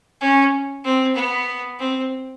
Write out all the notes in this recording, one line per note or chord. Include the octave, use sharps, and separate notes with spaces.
C#4
C4
B3
C4